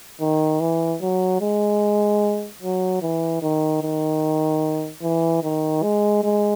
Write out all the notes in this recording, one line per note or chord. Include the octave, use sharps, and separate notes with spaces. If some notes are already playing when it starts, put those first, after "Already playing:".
D#3
E3
F#3
G#3
F#3
E3
D#3
D#3
E3
D#3
G#3
G#3